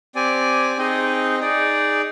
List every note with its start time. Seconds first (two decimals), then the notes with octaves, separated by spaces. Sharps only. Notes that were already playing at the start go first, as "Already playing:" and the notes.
0.15 C4 G4 D5 G#5
0.77 C4 D#4 G#4 D#5
1.39 D#4 G#4 D5